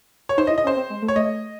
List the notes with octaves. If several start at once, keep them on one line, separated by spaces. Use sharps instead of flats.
C#5
D#4 C5
D#5
E4
D#5
C#4
C5
C4
G#3
A3
C#5
A3 D#5